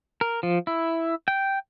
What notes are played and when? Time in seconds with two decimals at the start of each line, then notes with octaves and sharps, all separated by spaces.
0.21 A#4
0.43 F3
0.67 E4
1.28 G5